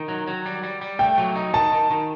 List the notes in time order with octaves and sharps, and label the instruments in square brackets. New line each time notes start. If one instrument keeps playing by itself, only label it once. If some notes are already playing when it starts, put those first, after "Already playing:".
Already playing: [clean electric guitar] D#3
F#3
F#3
G3
G3
G3
[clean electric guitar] A3 [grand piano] G5
[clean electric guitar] F#3
D#4
[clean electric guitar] D#3 [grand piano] A5
[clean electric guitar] D#3
D#3